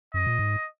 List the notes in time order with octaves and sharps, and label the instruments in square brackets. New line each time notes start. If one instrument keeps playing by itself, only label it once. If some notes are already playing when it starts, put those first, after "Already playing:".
[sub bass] F#2 [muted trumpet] D#5
[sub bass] A#2
G#2